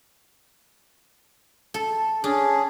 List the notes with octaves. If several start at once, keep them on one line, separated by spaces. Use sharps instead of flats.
A4
C#4 D4 G#4